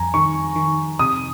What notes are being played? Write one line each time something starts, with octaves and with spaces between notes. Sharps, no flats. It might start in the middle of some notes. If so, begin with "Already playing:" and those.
Already playing: F2 G#5 A#5
D#3 C#6
D#3
C3 D#6